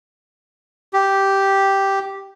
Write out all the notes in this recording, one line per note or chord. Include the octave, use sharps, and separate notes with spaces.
G4